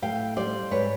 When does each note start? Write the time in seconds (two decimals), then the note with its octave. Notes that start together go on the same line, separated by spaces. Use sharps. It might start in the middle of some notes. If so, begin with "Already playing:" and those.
0.02 A2 F5 G5
0.37 G3 C5 D5
0.71 G#2 B4 C#5